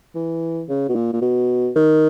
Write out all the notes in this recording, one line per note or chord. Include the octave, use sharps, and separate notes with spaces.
E3
C#3
B2
A#2
A#2
B2
D#3